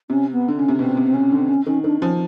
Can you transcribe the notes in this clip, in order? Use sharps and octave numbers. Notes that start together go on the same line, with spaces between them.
C3 C#4
B3
D3
C#3 C#4
C3
B2 C4
C3
C4
C#3 C#4
D3
C4
C#4
D#3 C#4
D#3 D4
F3 C#4